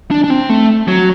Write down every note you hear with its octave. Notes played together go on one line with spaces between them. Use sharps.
D4
D4
C4
A3
F#3